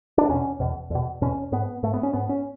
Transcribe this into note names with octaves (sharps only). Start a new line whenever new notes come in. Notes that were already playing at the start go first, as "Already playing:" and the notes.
D4
E2 B2 C#4
E2 B2
E2 B2
E2 B2 C#4
G#2 B3
G#2 A3
B3
C#4
G#2 B3
C#4